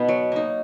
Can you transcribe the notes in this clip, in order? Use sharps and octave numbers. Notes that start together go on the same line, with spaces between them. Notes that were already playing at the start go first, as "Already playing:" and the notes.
Already playing: B2 B3 D#4
F#3
A#3 D#4